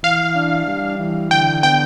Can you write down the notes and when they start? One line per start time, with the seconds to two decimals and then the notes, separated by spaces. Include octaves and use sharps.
0.03 E3 F5
0.35 D4
0.68 G3
1.00 E3
1.31 D3 G5
1.63 B3 G5